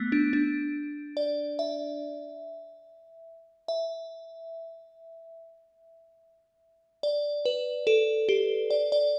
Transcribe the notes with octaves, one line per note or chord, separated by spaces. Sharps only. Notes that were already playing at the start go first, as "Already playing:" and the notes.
Already playing: A3 B3
D4
D4
D5
E5
E5
D5
B4
A4
G4
D5
D5